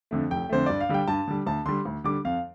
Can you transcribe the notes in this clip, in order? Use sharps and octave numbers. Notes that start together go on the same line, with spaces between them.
F2 D3 A3
F1 G5
F2 D3 A3 C5
G2 D5
F5
D3 G3 G5
G2 A5
D3 G3
D2 A5
D3 G3 C6
D2
D3 G3 D6
F2 F5